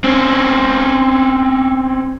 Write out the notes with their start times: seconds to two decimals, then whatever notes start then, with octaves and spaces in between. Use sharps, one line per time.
0.04 C4 C#4